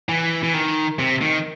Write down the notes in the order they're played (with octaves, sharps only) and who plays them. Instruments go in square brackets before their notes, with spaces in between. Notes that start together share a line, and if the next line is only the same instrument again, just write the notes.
[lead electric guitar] E3
E3
D#3
C3
D#3